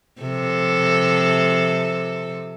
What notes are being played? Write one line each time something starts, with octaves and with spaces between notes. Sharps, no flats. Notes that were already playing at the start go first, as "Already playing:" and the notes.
C3 F3 A4